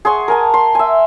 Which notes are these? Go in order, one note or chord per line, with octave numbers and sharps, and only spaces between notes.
G#4 F#5 C6 C#6
A#4 G#5 A5
C6
E5 G#5